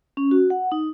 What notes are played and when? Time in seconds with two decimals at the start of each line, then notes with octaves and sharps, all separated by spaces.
0.17 C#4
0.31 F#4
0.50 F#5
0.72 D#4